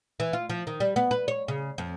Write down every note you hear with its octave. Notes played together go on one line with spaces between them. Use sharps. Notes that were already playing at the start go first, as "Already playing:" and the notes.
E3
F4
F3
D#3
G3
B3
B4
C#5
C#3
F2